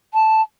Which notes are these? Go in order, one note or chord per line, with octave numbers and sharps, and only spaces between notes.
A5